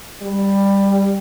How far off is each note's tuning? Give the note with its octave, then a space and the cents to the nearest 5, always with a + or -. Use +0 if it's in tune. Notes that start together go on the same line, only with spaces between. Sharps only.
G3 +10